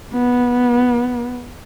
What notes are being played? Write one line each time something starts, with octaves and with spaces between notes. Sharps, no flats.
B3